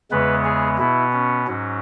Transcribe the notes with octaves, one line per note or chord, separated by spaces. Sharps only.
E2 C#3 G#3 B3 B4
G#4
B2 B3 E4
C#4
G#2 F#3 C#4